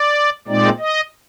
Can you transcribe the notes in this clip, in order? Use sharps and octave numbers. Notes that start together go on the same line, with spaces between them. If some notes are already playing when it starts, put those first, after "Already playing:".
Already playing: D5
A#2 G#3 C4 D#4 D5
D#5